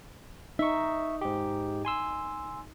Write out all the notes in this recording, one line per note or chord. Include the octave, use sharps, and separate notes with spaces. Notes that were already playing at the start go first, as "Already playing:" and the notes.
D#4 E5 C#6
G#2 G4
G#5 C6 E6